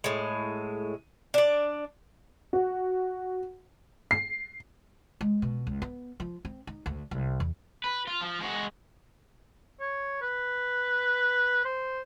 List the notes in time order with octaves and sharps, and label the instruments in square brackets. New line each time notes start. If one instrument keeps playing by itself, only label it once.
[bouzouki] A2 G#3
D4 D5
[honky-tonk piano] F#4
C7
[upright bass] G#3
B2
C#2
B3
F3
C4
D#4
D2
C2
E2
[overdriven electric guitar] B4
F4
F3
G#3 F#4
[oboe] C#5
B4
C5